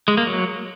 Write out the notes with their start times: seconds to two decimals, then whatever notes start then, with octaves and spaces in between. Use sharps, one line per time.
0.08 G#3
0.17 A#3
0.27 F#3